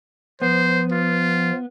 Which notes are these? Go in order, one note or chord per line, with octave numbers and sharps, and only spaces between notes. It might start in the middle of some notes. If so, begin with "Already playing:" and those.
F3 B3 C5
F4